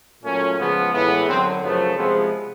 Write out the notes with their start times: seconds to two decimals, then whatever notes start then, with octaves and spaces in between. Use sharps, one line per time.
0.23 A#2 F#3 A3 C#4
0.58 C#3 F3 G#3 B3
0.93 A2 E3 G#3 B3
1.27 F#2 D3 F#3 C4
1.62 F#2 C#3 F3 A3 B3
1.96 C3 F3 G#3 B3 C4